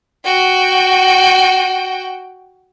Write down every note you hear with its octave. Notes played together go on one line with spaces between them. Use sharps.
F#4 G5